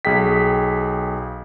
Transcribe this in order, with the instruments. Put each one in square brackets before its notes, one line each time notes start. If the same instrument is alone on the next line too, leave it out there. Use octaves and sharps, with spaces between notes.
[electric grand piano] B1 G#4 G5 B6